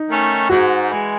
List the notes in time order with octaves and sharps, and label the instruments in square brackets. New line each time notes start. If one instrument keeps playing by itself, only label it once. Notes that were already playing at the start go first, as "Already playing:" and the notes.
Already playing: [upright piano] D#4
[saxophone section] D#3 A3 C#4
[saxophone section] G#2 [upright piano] F#4
[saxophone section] E3 G#3